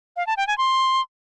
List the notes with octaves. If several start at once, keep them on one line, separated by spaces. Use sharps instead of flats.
F5
A5
G5
G#5
C6